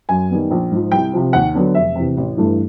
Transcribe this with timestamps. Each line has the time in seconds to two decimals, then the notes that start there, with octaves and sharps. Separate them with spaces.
0.09 F#2 G#5
0.30 D#3 G3 B3
0.51 A#1
0.72 G#2 F3
0.92 C2 G5
1.13 C3 F3
1.33 D#2 F#5
1.54 D3 F#3 B3 D4
1.75 F1 E5
1.95 E2 C3
2.17 A1
2.37 G2 E3 A3